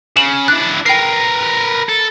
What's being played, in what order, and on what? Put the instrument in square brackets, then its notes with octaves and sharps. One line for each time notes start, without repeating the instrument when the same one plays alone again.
[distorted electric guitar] C#3 [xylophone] E7 F#7
[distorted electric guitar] D4 E4 [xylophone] F#6
[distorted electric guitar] A#4 B4 [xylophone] G5 C7
[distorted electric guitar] A4